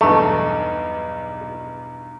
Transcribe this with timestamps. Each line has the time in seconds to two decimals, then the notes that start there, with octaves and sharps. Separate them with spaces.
0.01 B1 E2 G2 A3 D#5 A#5